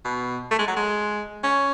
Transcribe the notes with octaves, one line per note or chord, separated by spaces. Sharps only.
B2
A3
G#3
F#3
G#3
C#4